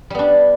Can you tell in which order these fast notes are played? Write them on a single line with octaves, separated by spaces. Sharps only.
G3 B3 D4